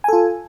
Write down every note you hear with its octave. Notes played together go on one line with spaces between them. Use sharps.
F4 A4 G#5